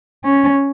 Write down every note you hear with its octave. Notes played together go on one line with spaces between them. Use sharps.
C#4